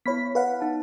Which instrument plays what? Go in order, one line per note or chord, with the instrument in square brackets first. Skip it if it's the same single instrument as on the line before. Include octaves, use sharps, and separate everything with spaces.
[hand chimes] B3 E4 [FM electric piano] C#5 B5 B6
[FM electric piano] B4 F5 F#5
[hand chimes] D#4 A5